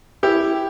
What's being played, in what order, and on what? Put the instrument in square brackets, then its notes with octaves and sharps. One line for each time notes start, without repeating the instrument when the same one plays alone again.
[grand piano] E4 G4